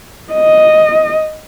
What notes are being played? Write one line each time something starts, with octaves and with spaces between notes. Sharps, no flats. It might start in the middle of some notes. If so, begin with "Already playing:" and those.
D#5